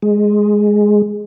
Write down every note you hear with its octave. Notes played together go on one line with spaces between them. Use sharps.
G#3